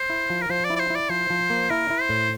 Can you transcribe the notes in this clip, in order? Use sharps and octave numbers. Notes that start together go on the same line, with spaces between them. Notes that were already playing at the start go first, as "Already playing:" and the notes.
Already playing: C5
E4
F3
A#4
F3 C5
D5
E4
D5
C5
E4 D5
F3 C5
F3
A#3
E4 A#4
E4
C5
A2